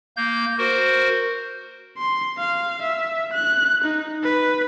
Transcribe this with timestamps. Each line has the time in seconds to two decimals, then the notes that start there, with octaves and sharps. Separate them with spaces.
0.17 A#3 G6
0.58 F#4 A#4 C5
1.98 C6
2.38 F5
2.82 E5
3.33 F#6
3.85 D#4
4.23 B4